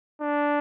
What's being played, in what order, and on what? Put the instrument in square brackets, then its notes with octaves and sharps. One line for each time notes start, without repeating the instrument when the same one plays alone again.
[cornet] D4